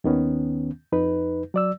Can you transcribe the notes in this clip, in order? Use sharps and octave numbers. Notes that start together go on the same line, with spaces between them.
D#2 D#3 B3 C#4
F2 D#4 B4
F#3 D5 E6